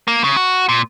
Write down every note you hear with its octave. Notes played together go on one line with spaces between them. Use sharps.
A#3
C#3
F#4
A#2